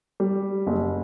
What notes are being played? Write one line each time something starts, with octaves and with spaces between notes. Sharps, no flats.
G3
F#1